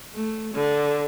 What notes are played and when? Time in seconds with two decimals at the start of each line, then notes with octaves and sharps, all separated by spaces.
0.16 A3
0.54 D3